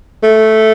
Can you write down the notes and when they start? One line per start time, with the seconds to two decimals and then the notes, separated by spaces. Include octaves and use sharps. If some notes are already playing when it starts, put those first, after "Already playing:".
0.23 A3